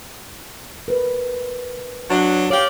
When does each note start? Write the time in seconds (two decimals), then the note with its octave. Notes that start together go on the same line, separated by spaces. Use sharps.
0.88 A#4 B4
2.09 F#3 D4
2.50 G4 C#5 D5 F5